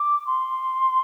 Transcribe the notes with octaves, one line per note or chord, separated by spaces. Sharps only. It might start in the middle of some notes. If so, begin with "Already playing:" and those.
Already playing: D6
C6